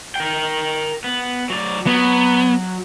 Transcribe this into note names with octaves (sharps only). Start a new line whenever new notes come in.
A#4 G5
B3
F#3 D5
F#3 B3